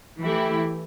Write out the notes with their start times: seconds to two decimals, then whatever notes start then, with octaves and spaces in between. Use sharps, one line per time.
0.22 E3 A3 E4 G4